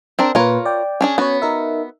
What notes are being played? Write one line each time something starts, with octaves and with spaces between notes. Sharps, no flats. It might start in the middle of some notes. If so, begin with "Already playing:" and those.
C4 D4 A#4
A#2 F4 A#4 B4 C#5
D5 G5
C#4 D4 G#4
B3 C#4 F#4 C#5
D#4 A#4 E5